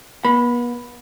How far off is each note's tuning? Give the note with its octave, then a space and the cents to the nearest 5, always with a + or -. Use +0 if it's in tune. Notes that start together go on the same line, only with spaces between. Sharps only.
B3 -40 B5 +0